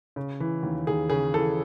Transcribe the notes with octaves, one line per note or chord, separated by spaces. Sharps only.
C#3
E3
D#2
D#2 G#4
C#3 G#4
E3 A4